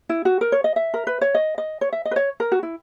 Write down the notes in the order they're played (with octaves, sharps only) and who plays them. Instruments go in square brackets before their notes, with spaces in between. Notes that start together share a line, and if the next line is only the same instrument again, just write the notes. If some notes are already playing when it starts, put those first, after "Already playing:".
[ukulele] E4
F#4
A#4
C#5
D#5
E5
A#4
B4
C#5
D#5
D#5
C#5
E5
D#5
B4
C#5
A#4
F#4
E4